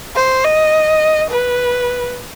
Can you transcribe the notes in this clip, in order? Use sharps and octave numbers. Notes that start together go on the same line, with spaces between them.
C5
D#5
B4